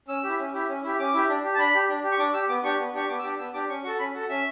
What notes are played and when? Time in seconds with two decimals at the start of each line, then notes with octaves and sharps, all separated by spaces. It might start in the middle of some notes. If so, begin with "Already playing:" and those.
0.08 C#4 E6
0.24 E4 G4
0.39 C#4
0.54 E4 G4
0.69 C#4
0.84 E4 G4
0.99 C#4 D6
1.14 E4 G4
1.29 D4
1.44 G4
1.54 A5
1.59 D4 B5
1.74 G4
1.89 D4
2.04 G4
2.12 C#6
2.19 D4 D6
2.34 G4 E6
2.49 B3 D6
2.64 D4 G4 C#6
2.79 B3
2.94 D4 G4 C#6
3.09 B3 D6
3.19 E6
3.24 D4 G4 D6
3.39 B3 E6
3.54 D4 G4 D6
3.69 C#4 C#6
3.84 F#4 C#6
3.87 A4
3.99 C#4 B5
4.14 F#4 A4
4.29 C#4 E5